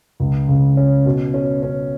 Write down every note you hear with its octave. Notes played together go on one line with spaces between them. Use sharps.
C#2
C#3
C#4
B2
C#4
C#4